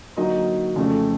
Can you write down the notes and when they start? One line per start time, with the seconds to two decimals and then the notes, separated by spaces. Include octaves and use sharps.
0.17 D3 F#3 A#3 D#4 D#5
0.76 F2 C#3 F3 A3